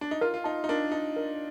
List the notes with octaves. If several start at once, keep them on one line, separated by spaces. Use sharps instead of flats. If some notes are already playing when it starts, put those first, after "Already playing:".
D4
D#4
F4 A#4
F4
D#4 A5
D#4
D4 A#4
D#4 A5
A#4